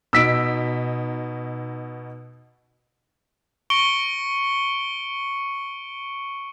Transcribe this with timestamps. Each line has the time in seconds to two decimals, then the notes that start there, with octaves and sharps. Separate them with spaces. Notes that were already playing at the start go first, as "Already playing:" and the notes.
0.13 B2 D#4 E6 B6 D7
3.70 C#6 C#7 D7 G7